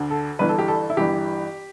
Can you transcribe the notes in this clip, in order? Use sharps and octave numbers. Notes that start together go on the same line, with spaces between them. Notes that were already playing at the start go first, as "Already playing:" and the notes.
Already playing: D2 D3
A4
G1 G2 E3 B4
A4
G4
A4
E4
G1 G2 E3 G4